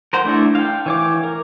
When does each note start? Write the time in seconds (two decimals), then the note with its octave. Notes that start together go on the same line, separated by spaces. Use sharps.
0.13 A#4 C5 F#5
0.25 A3 D4 E4 A4
0.55 F5 G5
0.86 E3 C#5 D6
1.23 A#4